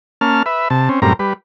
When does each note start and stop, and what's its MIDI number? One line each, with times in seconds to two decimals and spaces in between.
0.21 0.43 58
0.21 0.43 61
0.21 0.43 81
0.21 0.43 89
0.46 0.68 71
0.46 0.68 76
0.70 0.89 48
0.70 0.89 81
0.89 1.00 60
0.89 1.00 61
1.02 1.13 42
1.02 1.13 45
1.02 1.13 55
1.02 1.13 60
1.02 1.13 70
1.02 1.13 82
1.19 1.33 55
1.19 1.33 71